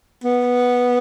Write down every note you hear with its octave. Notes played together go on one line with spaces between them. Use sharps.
B3